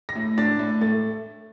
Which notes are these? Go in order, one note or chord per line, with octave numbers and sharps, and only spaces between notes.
A#6
A2
D4 A6
A2
A3 A6